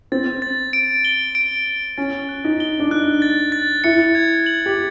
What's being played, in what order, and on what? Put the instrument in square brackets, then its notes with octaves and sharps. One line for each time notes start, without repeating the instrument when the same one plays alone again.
[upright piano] C4 [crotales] A6
[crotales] A6
D7
G7
D7
D7
[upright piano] C#4 [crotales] A6
[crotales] F#6
[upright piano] D#4
[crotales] G7
[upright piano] D4
[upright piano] D#4 [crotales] F#6
[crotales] A6
A6
[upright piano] E4 [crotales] C#7
[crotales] G#6
F#7
[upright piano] G4